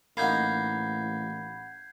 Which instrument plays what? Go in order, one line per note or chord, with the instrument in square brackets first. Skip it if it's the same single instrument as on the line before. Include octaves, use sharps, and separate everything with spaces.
[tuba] A1 [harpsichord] A#3 D#4 [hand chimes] F#5 B5 [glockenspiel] G6 G#6 C7